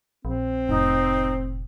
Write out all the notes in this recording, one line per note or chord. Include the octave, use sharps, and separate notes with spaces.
A#1 C4
F1 A2 D#4